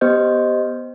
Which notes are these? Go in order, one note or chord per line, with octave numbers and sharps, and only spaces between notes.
B3 G4 C5 D#5 G6